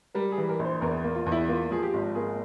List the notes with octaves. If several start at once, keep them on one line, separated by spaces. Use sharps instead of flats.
G3 A#4
G#4
E3
A#4
A#1
C5
E2 A#4
A#3
F4
E2
E4
A#3 F4
F3 G#4
G4
G#1
A#3 G#4